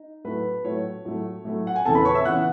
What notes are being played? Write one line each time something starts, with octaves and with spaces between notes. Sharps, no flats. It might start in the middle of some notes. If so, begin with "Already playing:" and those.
Already playing: D#4
A2 F#3 A3 B4
A2 F#3 A3 C#5
A2 F#3 A3
A2 F#3 A3
F#5
G#5
E2 C#3 E3 B3 A4 A5
B4 B5
C#5 C#6
E5 E6
C#3 E3 B3 F#5 F#6